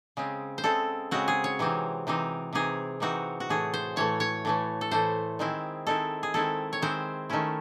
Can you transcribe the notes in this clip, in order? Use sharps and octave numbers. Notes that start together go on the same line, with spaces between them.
C#3 G#3 C4
C5
C#3 G#3 C4 A4
C#3 G#3 C4 F#4
G#4
C#5
C3 E3 C4 D#4
C3 E3 C4 D#4
C3 E3 C4 D#4 G#4
C3 E3 C4 D#4 F#4
F#4
A2 E3 A3 G#4
C5
A2 E3 A3 C#5
C#5
A2 E3 A3
A4
A2 E3 A3 C5
D#3 G#3 C4 E4
D#3 G#3 C4 E4 A4
G#4
D#3 G#3 C4 E4 A4
C#5
D#3 G#3 C4 E4 C5
D#3 A3 C#4 E4